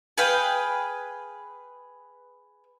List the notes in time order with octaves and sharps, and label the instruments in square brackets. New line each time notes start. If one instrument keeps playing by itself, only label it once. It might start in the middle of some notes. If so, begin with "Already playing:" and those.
[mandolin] G#4 B4 F5 G5